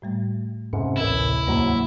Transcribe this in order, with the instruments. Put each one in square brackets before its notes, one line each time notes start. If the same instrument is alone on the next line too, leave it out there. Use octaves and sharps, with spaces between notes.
[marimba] A2 G3 A3
[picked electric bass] G#2 C3 [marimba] C#4
[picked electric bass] A1 [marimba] D2 C3 A#4 [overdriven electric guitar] E4
[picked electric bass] E2 G#2 F#3 [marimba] A#3